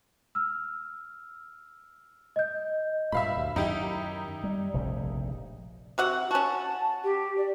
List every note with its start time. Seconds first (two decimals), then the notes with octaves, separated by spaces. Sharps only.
0.35 E6 F6
2.36 D#5 G6
3.12 G2 A#2 E5 F5 B5
3.37 D2
3.56 F#2 D#3 D#4 E4 G4
4.44 G3
4.74 F1 A#1 C#3
5.98 C3 F#4 F#5
6.31 C#4 F#4 A5
7.04 G4
7.37 D5